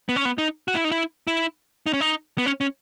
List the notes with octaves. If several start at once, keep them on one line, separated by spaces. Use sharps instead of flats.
B3
C#4
B3
D#4
F#4
E4
D#4
E4
E4
D#4
C#4
D#4
B3
C#4
C#4